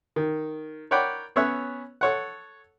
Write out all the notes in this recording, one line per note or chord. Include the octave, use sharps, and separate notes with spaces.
D#3
A#4 C#5 D5 F#5 G5 B5
B3 C#4 C#5 E5 E6 F#6
A4 C#5 F#5